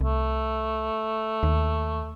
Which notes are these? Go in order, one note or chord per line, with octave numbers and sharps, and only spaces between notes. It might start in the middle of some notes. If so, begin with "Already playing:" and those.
C2 A3
D#2